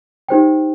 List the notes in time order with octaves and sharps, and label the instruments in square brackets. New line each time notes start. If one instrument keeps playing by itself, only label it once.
[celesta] D#4 G4 C5 G5